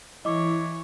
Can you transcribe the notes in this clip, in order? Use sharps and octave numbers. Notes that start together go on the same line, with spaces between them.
E3 E4 C#5 D#5 D6